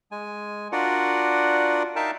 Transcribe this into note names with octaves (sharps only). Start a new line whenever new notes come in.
G#3 G#5
D4 F4 F#4 A#4 D5 F#5
D#4 A#4 E5 F5 G5 A5